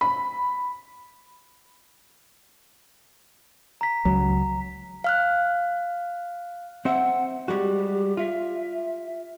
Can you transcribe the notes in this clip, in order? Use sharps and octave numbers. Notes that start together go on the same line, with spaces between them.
B5
A#5 B6
C#2 F#3 A#5
F5 F6 F#6
C4 C5 E5 F#5
G3 G#3 F#4 G4
F4 E5